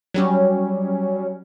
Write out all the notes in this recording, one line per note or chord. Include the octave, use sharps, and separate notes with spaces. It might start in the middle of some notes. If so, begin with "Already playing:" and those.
F#3 G3 C#4